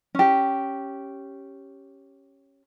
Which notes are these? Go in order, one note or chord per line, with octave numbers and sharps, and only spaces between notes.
C#4 G4